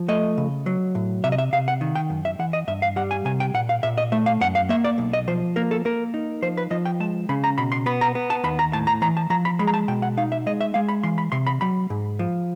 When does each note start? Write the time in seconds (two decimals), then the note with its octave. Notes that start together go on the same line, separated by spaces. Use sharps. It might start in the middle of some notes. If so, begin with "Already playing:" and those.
Already playing: F3
0.08 A3 D#5
0.38 C#3
0.66 F#3
0.95 A2
1.24 C3 E5
1.32 D#5
1.38 E5
1.53 C3 F5
1.68 F#5
1.81 D#3
1.95 G5
2.10 F#2
2.25 E5
2.39 E3 F#5
2.53 D#5
2.67 G2 E5
2.82 F5
2.96 G3 F#5
3.11 G#5
3.25 C3 G#5
3.40 G5
3.54 A#2 F#5
3.69 F5
3.83 A#2 E5
3.98 D#5
4.12 A3 E5
4.26 F5
4.41 F#2 F#5
4.55 F5
4.69 A#3 E5
4.84 D5
4.98 B1
5.13 D#5
5.28 F3 C5
5.56 A#3 A#4
5.71 A4
5.85 A#3 A#4
6.14 D#4
6.42 F3 C5
6.57 B4
6.71 F3 D#5
6.85 G5
7.00 G#3 A5
7.29 C#3 B5
7.44 A#5
7.58 B2 B5
7.72 C6
7.86 B3 B5
8.01 A#5
8.15 B3
8.30 A5
8.44 D#2 B5
8.59 A#5
8.73 A2 A5
8.87 A#5
9.02 E3 A#5
9.17 A5
9.30 F3 A#5
9.45 B5
9.59 G#3 B5
9.67 A#5
9.74 A5
9.88 B2 G5
10.02 F#5
10.17 D#4 F5
10.32 E5
10.46 G#3 D#5
10.61 E5
10.74 G#3 F5
10.89 B5
11.03 E3 C6
11.18 B5
11.32 C3 C6
11.47 B5
11.61 F#3 B5
11.90 G#2
12.19 F3